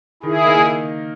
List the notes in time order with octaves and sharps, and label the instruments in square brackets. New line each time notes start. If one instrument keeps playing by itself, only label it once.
[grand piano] D#3 [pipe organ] E4 G#4
[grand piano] A#3 D#4